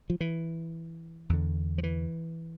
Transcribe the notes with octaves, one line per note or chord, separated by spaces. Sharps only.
F3
E3
E2 D3
F3
E3